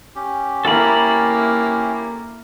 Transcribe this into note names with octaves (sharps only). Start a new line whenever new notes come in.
C#4 G4
A#3 E4 A4 B5